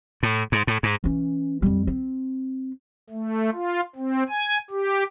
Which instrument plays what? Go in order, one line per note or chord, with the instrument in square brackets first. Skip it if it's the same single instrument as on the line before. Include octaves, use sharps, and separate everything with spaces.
[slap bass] A2
G#2
A2
G#2
[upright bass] E3 C#4
F2 G3
C4
[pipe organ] A3
F4
C4
G#5
G4